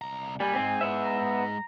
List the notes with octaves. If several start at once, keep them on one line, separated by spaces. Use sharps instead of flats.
C2 A#5
G3 A#3 G#5 B5
G#2 G#3 C4
B3 E5
A#5